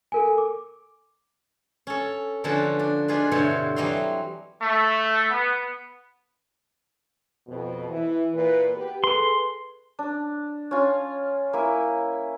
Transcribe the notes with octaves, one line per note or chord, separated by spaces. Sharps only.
A4 A#4 G#5
D6
C#4 A4
D3 F3 B3 C#4 F#4 A5
D4
D4 D#4 F4 G#4 B4
G2 B2 D3 E3 C4 C#5
E3 F#3 G3 D#5 A#5 C6
A3
B3
F2 B2
E3
A#2 E3 B4
B3 G4 B4
G#4 A4 B4 C6
D4
C#4 F4
A#3 E4 G#5